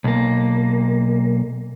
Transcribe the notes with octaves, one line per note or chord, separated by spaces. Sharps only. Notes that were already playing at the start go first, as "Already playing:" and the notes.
B1 A#3